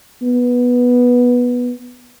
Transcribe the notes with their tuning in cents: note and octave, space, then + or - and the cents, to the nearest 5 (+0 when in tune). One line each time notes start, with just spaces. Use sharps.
B3 -10